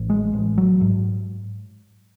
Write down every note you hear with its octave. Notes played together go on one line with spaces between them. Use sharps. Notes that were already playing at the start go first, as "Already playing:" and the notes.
Already playing: A1
G#3
A1
F#3
G#2